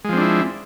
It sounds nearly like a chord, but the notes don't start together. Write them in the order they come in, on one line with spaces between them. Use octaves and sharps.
G#3 F3 C4 D4 E4